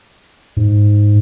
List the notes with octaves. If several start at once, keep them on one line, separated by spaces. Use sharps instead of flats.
G#2